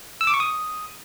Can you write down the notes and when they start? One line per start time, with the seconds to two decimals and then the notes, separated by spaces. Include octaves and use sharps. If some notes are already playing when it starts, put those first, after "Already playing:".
0.21 E6
0.27 D6
0.34 C#6
0.40 D#6